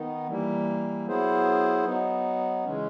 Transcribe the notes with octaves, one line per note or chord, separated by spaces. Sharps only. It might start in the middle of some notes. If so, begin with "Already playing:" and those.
Already playing: D#3 B3 D#4
E3 G3 A#3
F#3 B3 E4 G#4 C5
F#3 B3 D#4
C#3 E3 G#3 C#4